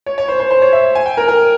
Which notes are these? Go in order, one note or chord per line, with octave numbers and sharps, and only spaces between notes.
C#5
C#5
C5
C5
C5
C#5
E5
G#5
G5
A#4
A#4